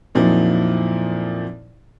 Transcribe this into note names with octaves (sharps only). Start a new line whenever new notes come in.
F2 A#2 F3 F#3 D#4 E4